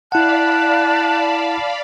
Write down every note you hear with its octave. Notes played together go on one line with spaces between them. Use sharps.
E4 D5 F5 F#5 A5 B5 F#6